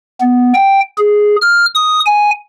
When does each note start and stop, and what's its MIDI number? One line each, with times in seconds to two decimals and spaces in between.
0.21 0.53 59
0.54 0.81 79
0.98 1.36 68
1.42 1.66 89
1.75 2.00 87
2.06 2.31 80